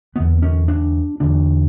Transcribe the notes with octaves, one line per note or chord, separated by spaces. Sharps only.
E2 D3 B3
C#4
D4
E2 D3 D4